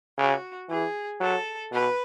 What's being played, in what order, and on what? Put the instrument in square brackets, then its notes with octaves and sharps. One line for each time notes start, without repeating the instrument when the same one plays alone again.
[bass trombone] C#3 [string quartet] F#4
[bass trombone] E3 [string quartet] G#4
[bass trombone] F#3 [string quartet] A4
[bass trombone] B2 [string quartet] B4